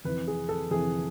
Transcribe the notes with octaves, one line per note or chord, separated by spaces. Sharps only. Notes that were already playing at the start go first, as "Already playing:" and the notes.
F2 C3 E3 B4
G#4
A4
F2 C3 E3 G#4